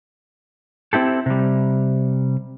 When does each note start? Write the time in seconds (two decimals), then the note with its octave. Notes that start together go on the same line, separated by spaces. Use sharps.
0.93 C4 E4 G4 A4
1.26 C3 G3